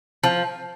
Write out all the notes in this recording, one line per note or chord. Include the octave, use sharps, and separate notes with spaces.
F3